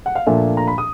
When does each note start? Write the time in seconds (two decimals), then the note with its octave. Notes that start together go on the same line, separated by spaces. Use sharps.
0.06 F#5
0.15 F5
0.27 A#2 F3 A3 D4 E5
0.57 A#5
0.68 B5
0.78 D#6